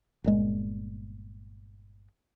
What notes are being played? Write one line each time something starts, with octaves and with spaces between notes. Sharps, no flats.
G1 A#2 G#3